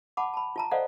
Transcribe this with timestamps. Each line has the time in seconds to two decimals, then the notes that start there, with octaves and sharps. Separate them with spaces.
0.17 F#5 A5 B5 D6
0.34 A5 B5
0.56 F4 A5 A#5
0.71 A4 C5 D5 D#5 F5 F#5